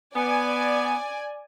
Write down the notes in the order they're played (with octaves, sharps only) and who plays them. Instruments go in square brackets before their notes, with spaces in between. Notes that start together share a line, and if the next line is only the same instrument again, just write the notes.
[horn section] B3 [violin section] D5 G#5